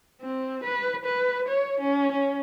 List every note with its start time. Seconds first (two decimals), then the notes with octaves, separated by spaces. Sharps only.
0.21 C4
0.63 B4
1.05 B4
1.47 C#5
1.80 C#4
2.11 C#4